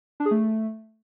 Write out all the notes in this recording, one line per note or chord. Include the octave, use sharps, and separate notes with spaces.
D4
G#4
A3